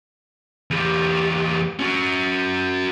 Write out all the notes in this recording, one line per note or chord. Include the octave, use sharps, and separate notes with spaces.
E2 G4
C#4 F#4